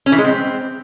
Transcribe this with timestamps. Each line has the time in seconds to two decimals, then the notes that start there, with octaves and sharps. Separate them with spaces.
0.06 C#4
0.12 E3
0.18 G#3
0.24 C4